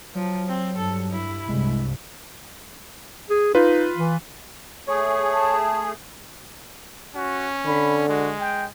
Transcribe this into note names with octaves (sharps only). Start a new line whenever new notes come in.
F3 F#3
C4
G2 A4
E4
C2 G2 G#3
G#4
D#4 F4 B4
E3
A3 G#4 C#5
A5
C#4 F#4
D3 B5
G#3 F#4
G5